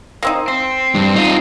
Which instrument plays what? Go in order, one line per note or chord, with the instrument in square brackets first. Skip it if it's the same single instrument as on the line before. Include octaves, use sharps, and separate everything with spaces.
[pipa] A#3 C4 D#4
[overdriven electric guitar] C4 [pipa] C5
[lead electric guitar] G2
D#4 F4